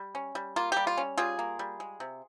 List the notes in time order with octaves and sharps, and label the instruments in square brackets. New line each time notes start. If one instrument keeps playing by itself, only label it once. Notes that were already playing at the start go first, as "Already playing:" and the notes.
Already playing: [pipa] G3
C#4
G3
A#3 F4
G3 G4
F4
C#4
G3 F4 G#4
A#3
G3
G#3
C3